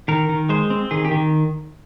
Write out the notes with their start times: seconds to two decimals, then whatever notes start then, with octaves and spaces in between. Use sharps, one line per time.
0.08 D#3 A#4
0.29 D#3
0.49 G#3 C5
0.70 C4
0.91 D#3 G#4
1.05 G4
1.11 D#3